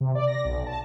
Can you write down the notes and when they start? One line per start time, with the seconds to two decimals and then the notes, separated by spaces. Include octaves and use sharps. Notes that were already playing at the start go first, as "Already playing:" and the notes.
0.01 C3
0.15 D5
0.28 A#6
0.45 B1
0.66 A5